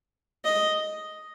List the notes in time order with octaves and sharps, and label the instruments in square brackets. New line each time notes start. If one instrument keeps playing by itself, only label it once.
[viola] D#5